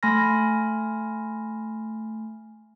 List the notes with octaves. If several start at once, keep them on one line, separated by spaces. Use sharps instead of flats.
A3 G#5 B5 C6 F6 A#6